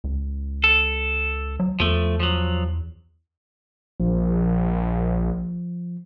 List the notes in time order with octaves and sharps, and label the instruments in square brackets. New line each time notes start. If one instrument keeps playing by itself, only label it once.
[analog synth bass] C#2
[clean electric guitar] A4
[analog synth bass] F#3
[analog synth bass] E2 [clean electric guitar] F3 A3
[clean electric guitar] F3 F#3
[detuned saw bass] A#1 [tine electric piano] F3